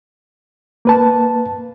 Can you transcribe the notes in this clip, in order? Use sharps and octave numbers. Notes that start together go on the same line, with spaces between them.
A#3 B4 A5